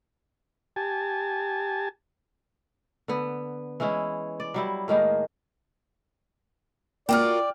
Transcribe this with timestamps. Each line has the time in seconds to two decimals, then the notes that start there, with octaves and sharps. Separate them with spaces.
0.76 G4 G#5 A5
3.08 D3 B3
3.80 E3 G#3 C#4 E4
4.40 D5
4.54 F#3 G3 E4
4.88 A2 D#3 G#3 A#3
7.09 A#3 F4 F#4 D5 G5 F6